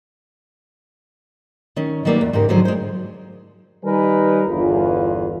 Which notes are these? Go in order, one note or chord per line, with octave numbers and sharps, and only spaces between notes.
D#3 C#4
D#3 F#3 G3 A#3 B4 D5
E2
G#2 C#3 G4 A#4
D3 D#3 F3 F#3 G#4 C5
G#3 C5
D#3 G3 D#4 A#4 B4 G#5
G1 E2 F4